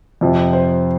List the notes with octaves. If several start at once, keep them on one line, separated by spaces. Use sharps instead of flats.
F2 C3 F3
C5